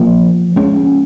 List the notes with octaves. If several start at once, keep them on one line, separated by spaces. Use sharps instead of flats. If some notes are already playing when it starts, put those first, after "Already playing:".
Already playing: F3 A#3
G#3 C#4